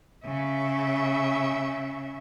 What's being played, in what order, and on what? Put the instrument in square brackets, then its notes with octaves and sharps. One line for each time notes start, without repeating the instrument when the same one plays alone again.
[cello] C#3 E5